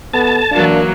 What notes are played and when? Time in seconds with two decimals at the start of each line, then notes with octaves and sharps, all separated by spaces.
0.14 B3 A4 A5
0.52 E3 F#3 A#3 D4 A#4 F5